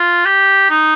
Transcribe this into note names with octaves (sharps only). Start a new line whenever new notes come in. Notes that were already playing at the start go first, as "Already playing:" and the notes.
Already playing: F4
G4
D#4